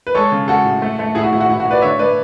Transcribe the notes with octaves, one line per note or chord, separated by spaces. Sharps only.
B4
G#3 A4 C#5
C#3
G#3 F#4 A4
A2
A3
A3
A2 E4 G#4
F#4
A2 E4
F#4
A2 E4
F#4
A2
B4 D5
D3 C#5 E5
A3 B4 D5